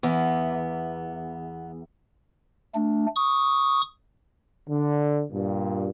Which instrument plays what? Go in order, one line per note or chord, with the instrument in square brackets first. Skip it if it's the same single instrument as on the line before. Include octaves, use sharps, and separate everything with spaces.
[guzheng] E2 [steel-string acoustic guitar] B3
[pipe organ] A3 D4
C#6 D#6
[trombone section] D3
G2 A#2